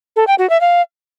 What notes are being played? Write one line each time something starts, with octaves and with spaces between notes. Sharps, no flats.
A4
G5
F#4
E5
F5